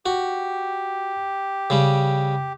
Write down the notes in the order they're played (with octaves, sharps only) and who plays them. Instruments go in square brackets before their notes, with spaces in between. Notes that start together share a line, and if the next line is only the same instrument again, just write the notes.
[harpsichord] F#4 [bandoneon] G4
[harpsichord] C#3 G3